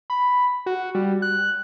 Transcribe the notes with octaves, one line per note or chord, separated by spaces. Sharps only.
B5
F#4
G3
F#6